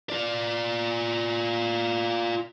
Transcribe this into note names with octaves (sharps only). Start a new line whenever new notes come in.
F4 D5